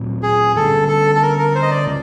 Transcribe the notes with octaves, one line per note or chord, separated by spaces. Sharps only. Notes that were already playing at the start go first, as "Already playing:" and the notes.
Already playing: A#2 F#3 A3 C4
G#4
D3 G3 A#3 C#4 A4
A4
A4
A#4
A#4
C5
D#5
D5
C#3 G#3